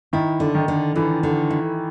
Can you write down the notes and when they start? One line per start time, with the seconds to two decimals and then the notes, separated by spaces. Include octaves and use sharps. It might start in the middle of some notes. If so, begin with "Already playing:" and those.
0.13 D#3 E4
0.40 D3
0.55 D#3
0.68 D3
0.95 D3 E3
1.23 D3
1.50 E4